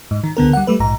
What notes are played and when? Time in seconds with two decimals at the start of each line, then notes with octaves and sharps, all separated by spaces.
0.11 G#2
0.24 D#3
0.37 C#2 D3 B3 A#4
0.53 G3 F#5
0.67 G3 A3 B4
0.80 A#1 G#2 A#5